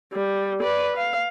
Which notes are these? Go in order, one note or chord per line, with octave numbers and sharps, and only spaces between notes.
G3
B4 D5
F5